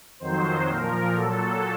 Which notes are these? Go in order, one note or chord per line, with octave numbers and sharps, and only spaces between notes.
F2 D#3 F#3 C5
A#2 F3 A#4
A#2 F#3 A4